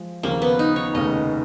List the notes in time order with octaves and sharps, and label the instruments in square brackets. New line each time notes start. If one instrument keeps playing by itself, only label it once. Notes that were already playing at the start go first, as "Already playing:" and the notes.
Already playing: [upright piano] F3 G#3
[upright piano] D#2 C#3 F3 [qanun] A#3
[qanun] B3
D#4
C#5
[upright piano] F1 D#2 C#3 [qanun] D#5